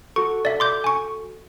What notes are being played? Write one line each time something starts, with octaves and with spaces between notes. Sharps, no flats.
F#4 A4 C#6
D5 E5
C6 D6 G6
G#5 C#6